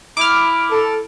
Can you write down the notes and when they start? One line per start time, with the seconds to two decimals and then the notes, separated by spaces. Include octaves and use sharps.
0.17 E4 D6 F6
0.70 A4